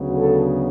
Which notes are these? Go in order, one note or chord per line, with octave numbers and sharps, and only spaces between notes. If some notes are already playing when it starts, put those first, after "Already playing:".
Already playing: D2 C#3 F#3 B3
A4